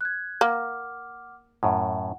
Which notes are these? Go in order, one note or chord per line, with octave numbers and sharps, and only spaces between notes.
F#6 G#6
A#3 F#5 D6 F6
F#2 A2 F#5